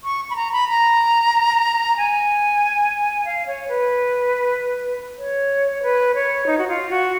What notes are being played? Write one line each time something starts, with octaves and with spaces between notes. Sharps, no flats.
C#6
B5
A#5
B5
A#5
G#5
F5
C#5
B4
C#5
C#5
B4
C#5
D#4
F#4
F4
F#4